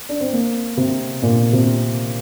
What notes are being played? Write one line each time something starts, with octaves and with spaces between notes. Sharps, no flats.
D4
C4
A#3
C3
A#2
C3